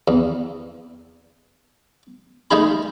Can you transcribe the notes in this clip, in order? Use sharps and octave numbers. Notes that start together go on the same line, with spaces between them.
E2
G#3 A3 D#4 G#4 B5